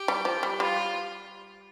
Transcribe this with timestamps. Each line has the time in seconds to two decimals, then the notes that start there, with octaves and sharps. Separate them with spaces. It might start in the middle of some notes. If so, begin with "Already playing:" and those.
Already playing: G4
0.08 G3
0.25 F3
0.43 G3
0.60 G3 F4